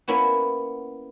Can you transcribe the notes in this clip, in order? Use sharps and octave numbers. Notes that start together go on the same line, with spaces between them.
A#3 B3 C#4 E4 F#4